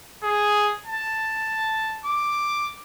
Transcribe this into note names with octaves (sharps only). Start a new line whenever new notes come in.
G#4
A5
D6